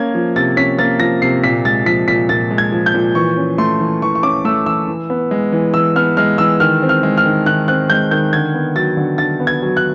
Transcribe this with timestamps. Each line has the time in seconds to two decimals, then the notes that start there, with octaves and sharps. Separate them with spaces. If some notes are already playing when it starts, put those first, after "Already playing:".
Already playing: A#3 C#4 G#6
0.15 F3
0.36 C3 A6
0.57 C#4 B6
0.79 A#3 A6
1.00 F3 A#6
1.22 C3 C7
1.44 A#2 B6
1.65 G#3 A6
1.86 F3 B6
2.08 A#2 B6
2.29 A#2 A6
2.51 G#3
2.58 G#6
2.72 F3
2.86 G6
2.94 A#2
3.15 E3 C#6
3.37 C#4
3.58 A3 C6
3.80 E3
4.02 E3 C#6
4.15 C#6
4.23 C#4 D6
4.45 A3 E6
4.66 E3 E6
4.87 E3
5.10 B3
5.31 G#3
5.52 E3
5.74 E3 E6
5.96 B3 F6
6.17 G#3 F6
6.38 E3 E6
6.60 D#3 F6
6.82 C4
6.89 F6
7.03 G#3
7.18 F6
7.25 D#3
7.46 D#3 F#6
7.68 C4 F#6
7.90 G#3 G6
8.11 D#3 G6
8.33 D3 G#6
8.54 B3
8.76 F#3 A6
8.97 D3
9.18 D3 A6
9.40 B3
9.47 G#6
9.62 F#3
9.77 F#6